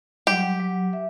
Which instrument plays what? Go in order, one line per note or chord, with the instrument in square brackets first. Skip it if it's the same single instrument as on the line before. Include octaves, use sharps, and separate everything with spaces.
[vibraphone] F#3 G3 [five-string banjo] G4
[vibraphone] F#3
E5